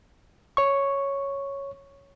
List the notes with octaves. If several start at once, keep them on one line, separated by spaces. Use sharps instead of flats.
C#5 C#6